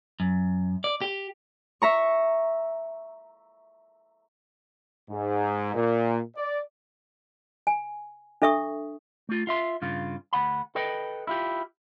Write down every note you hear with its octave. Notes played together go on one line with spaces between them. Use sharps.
F#2
D5
G4
E5 A#5 C#6
G#2
A#2
D5
G#5
D4 A4 E5 C#6 D#6
A3 F4
F4 E5 C6
G2 C#3 F4
D2 F#5 B5
A4 B4 D#5 G5
E4 F4 G4